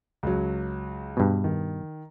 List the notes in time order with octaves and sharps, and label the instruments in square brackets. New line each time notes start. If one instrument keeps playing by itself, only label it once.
[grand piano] C#2 F#3
[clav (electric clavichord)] G2 B2
[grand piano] D#3